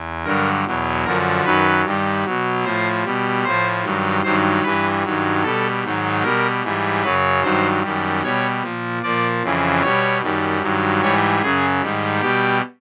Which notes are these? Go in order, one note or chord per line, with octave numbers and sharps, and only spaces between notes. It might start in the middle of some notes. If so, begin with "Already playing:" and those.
Already playing: E2
G2 D3 F#3 A#4
E2 B2 F#3
F#2 D3 F3 A#4
F#2 D#3 F#3 B4
G2 D#3 G3
B2 F#3
A2 F3 C5
B2 G3
A2 F3 C5
G2 D#3 F#3
G2 D#3 F#3 C5
G2 E3 G3 B4
G2 D#3 F#3
B2 G3 A4
G#2 D#3 F#3
B2 G3 A#4
G#2 E3 G3
F#2 C#3 F#3 B4
G2 D#3 F#3 C5
F#2 D#3 G3
B2 G3 C#5
A#2 F3
A#2 F3 D5
F2 C#3 E3
B2 G3 C#5
F#2 D#3 G3
G2 D#3 F#3
G#2 E3 G3 C#5
F#2 C#3 F#3 G#4
G#2 D#3 G3
B2 G3 G4